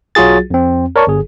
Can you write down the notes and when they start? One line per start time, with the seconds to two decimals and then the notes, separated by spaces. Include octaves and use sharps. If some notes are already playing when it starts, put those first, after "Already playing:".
0.15 B1 F#3 F4 F#4 G#4 A6
0.50 F2 C4
0.96 A#4 C#5 D5 A5 C#6
1.07 G1 G#4